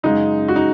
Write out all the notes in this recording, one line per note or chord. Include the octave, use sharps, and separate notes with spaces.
F#2 C#3 G#3 D#4
F#4
D#4